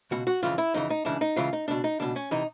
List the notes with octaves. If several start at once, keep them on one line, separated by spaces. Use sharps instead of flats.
C#2 B2 F#4
F#4
F2 C#3 E3 F4
E4
F2 C#3 E3 D#4
D#4
C#2 C#3 E3 D4
D#4
C#2 C#3 E3 F4
D#4
C#2 B2 D4
D#4
C#2 B2 D4
C#4
C3 E3 D#4